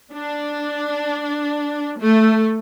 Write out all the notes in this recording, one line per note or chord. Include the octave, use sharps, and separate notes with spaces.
D4
A3